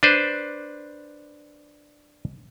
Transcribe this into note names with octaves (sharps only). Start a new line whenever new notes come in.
D4 B4 C5